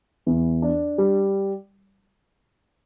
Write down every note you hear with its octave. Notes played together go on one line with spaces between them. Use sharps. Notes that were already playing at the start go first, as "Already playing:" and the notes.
E2
D4
G3